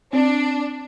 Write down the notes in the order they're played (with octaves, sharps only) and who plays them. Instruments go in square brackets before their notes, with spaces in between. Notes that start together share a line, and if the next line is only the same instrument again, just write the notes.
[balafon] C4 [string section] D4